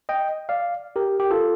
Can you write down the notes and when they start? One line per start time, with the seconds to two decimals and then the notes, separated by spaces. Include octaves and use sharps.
0.09 D#5 G5
0.49 D5 F5
0.96 G4 A#4
1.20 G4
1.31 F4 A4